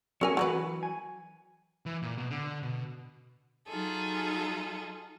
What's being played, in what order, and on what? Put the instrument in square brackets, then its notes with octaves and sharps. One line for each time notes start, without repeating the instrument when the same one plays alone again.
[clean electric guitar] F#3 A3 C#5 [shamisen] C#4 A#4 G#5
[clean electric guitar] E3 F#3 [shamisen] F#4 A#4 B4
[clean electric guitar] G#5
[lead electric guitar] E3
A#2
B2
D3
B2
[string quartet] F#3 D#4 F4 G#4 A4